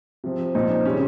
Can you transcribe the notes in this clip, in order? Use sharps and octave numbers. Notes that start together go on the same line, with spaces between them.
C3 F3 C4
A#2 F3 C4 D#4
C#3 G3 C4 C#4